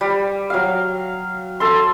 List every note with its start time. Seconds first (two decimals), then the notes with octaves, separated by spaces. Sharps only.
0.01 G3
0.50 F#3 F5
1.60 A4 C6